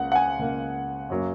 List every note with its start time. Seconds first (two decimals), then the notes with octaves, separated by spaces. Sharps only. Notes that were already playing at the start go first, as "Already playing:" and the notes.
Already playing: C#2 C#3 A#3 F#5
0.12 F#5
0.15 G#5
0.39 C#2 C#3 A#3
1.10 F#2 F#3 A#3